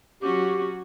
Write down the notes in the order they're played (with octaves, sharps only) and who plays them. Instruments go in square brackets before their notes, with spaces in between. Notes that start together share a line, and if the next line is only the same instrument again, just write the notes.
[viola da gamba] F#3 C#4 F#4 [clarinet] G4